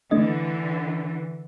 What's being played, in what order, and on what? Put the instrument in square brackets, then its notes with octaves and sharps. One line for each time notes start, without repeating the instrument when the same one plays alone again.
[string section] D3 E3 [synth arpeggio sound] A3 D4 D#5